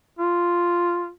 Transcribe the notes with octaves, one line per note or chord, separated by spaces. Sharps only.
F4